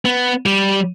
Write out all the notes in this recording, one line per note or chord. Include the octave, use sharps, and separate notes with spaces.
B3
G3